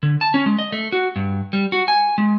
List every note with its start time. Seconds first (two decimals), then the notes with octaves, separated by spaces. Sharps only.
0.03 D3
0.21 A5
0.34 C#4
0.46 G#3
0.59 D#5
0.72 A3
0.92 F#4
1.16 G2
1.53 G3
1.72 F#4
1.88 G#5
2.18 G#3